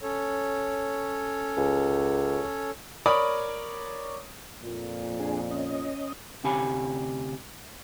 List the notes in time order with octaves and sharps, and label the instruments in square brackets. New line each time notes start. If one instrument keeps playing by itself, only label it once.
[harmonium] C#4 A4 C#5
[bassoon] C#2
[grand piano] A#4 C#5 D5 B5 D6 D#6
[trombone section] F2 A#2
[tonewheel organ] D4 G#4
C#4 D#5
[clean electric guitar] D2 C3 C#4 G4 G#5 B5